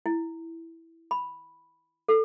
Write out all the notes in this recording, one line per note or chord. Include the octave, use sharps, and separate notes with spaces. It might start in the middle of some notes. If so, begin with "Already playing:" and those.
E4
B5
A4